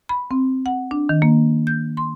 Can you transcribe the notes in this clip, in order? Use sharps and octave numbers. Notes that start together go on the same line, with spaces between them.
B5
C4
F#5
D4
D#3
A#3
G6
C6